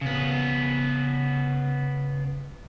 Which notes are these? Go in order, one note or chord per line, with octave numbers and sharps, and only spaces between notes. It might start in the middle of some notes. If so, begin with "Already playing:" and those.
C#3 B3